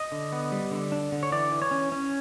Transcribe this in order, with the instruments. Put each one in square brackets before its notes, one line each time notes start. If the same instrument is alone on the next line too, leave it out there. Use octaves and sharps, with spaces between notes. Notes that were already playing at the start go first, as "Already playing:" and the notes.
Already playing: [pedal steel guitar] D#5
D3
B3
G3
D3
D4
D3
C#5
E3 D5
E3
C#5
C#4
C#4